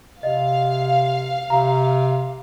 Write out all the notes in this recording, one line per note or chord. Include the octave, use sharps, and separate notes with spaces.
C3 D#5 F5
C3 A#5